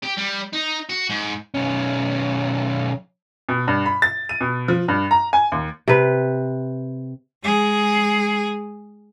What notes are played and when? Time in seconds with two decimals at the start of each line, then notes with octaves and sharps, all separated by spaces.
0.04 G4
0.18 G3
0.53 D#4
0.90 F#4
1.10 G#2
1.54 B1 C#4
3.49 B2
3.68 G2
3.86 B5
4.02 A6
4.29 D#7
4.41 B2
4.68 F3
4.88 G2
5.11 A#5
5.33 G#5
5.52 D#2
5.88 C3 B4
7.43 G#3 G#4